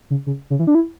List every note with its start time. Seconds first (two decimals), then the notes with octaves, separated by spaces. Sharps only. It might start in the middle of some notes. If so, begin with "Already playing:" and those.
0.10 C#3
0.27 C#3
0.50 C#3
0.59 E3
0.67 D4
0.75 E4